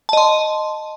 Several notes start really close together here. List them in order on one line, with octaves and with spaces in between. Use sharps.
A5 D#5 C6